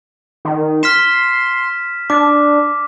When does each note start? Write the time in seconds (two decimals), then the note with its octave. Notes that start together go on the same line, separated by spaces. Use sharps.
0.45 D#3
0.83 C6 F6 B6 E7
2.10 D4 D6